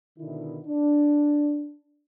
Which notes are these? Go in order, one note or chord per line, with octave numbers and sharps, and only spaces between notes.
B2 D3 D#3 E4
D4